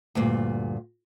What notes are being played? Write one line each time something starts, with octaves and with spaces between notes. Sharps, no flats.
D2 G2 A#2